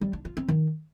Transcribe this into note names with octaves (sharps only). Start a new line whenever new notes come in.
G3
D4
F4
C4
D#3